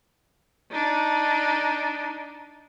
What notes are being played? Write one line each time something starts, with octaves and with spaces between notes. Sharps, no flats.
D4 D#4